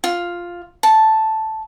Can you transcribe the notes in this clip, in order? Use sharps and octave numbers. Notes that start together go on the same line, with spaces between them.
F4
A5